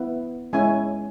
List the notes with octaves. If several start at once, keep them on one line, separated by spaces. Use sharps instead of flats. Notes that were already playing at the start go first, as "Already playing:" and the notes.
Already playing: B3 E4
G#3 C#4 E4 G#5